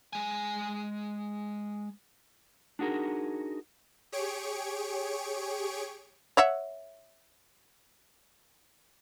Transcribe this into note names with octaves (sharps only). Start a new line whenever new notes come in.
G#3 G#5
D4 D#4 F#4 G#4 A#4
G4 G#4 C#5 C#6 D7
C#5 E5 F#5